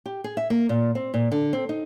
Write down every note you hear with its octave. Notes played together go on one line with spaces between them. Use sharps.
G4
G#4
E5
A#3
A#2
C4
A#2
D3
C4
D#4